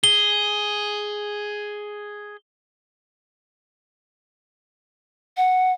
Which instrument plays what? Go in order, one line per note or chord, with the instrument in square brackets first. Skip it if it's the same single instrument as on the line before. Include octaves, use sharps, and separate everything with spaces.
[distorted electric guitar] G#4 [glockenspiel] G7
[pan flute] F#5